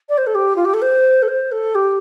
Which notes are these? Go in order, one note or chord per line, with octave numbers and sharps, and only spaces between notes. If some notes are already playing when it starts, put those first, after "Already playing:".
D5
C5
A4
G4
F4
G4
A4
C5
A4
C5
A4
G4